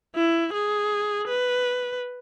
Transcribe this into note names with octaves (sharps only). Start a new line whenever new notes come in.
E4
G#4
B4